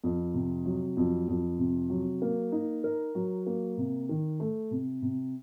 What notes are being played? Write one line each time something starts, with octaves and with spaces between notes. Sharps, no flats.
F2
C3
F#3
F2
F2
C3
F#3
A#3
D#4
A#4
F#3
A#3
C3
D#3
A3
C3
C3